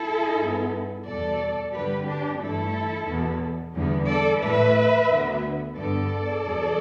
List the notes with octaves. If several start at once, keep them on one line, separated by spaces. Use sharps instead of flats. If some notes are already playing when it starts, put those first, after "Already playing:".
Already playing: E4 A4
G2 G3 B3
E2 B2 G3 A4 D5
G2 D3 G3 G4 B4
D4 G4
G2 E3 A3 E4 A4
E2 B2 B3
E2 D3 G3 B3
A4 D5
A2 A3 B4 E5
D2 D3 B3
G2 D3 B3 A4 D5
E2 B2 G3